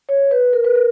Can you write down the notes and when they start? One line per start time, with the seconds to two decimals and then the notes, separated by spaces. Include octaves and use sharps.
0.09 C#5
0.31 B4
0.53 A#4
0.64 B4
0.75 A#4